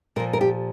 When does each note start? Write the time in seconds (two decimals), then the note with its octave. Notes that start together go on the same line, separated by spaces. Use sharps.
0.16 A#2 A#4
0.20 F3
0.33 A#4
0.41 G4